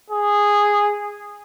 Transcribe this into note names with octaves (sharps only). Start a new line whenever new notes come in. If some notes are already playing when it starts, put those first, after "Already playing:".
G#4